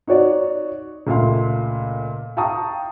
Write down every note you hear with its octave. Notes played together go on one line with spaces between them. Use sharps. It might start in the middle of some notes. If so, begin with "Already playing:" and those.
D#4 F#4 C#5 D5
C#2 A#2 A3 F5 C6
F5 G5 A5 A#5 C#6 D#6